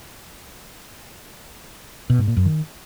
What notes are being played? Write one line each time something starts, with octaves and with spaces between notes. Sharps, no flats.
B2
G#2
A#2
F#2
D#3